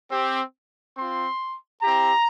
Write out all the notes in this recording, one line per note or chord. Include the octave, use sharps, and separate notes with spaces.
C4 G4
C4 F4 C6
C4 E4 G4 A#5